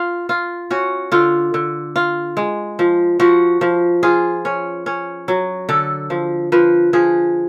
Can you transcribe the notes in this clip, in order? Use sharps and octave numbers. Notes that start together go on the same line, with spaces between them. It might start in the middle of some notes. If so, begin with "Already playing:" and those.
Already playing: F4 F5
F4
C#4 F#4
D3 F4
D3
F4
G#3
F3
F3 F#4
F3
F4 G#4
C#4
C#4
F#3
D3 A4
F3
F3 B4
F3 G#4